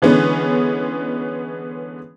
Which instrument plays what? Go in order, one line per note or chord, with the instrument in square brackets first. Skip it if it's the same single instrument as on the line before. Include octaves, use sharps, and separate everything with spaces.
[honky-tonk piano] D3 E3 G#3 B3 C#4